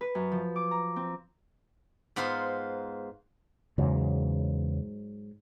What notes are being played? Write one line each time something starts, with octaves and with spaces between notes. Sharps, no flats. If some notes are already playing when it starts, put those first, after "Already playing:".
B4
F#2
F3
D6
A#5
C4
G#2 B3 F4 B4 C5 C6
E2 G#2 C#3 F#3